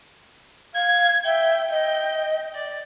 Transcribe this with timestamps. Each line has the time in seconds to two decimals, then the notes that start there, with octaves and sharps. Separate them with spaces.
0.75 F5 G#6
1.25 E5 G5
1.71 D#5 G5
2.55 D5